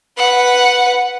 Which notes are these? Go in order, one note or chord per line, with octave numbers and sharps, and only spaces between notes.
B4 F#5